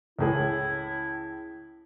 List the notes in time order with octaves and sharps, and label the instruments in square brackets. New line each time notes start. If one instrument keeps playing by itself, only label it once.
[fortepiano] C#2 A2 G#4 [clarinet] E4